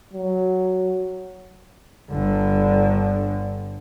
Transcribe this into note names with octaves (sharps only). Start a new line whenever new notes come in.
F#3
G1 D3